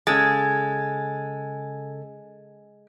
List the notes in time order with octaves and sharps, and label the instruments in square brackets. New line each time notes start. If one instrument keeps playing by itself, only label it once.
[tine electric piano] C#3 A4 A6 [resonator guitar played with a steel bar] G#3 [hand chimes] G#5 G#6